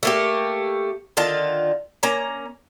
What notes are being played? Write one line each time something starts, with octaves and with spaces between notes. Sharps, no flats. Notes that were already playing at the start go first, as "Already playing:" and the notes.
A3 A#3 G4
D3 D#3 F4 A5
A#3 C#4 A#5